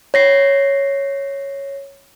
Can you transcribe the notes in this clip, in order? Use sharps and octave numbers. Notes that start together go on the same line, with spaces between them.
C#5 A#6 C7